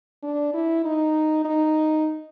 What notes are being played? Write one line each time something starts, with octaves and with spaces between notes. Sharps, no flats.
D4
E4
D#4
D#4